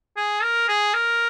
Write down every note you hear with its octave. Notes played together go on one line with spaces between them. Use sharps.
G#4
A#4
G#4
A#4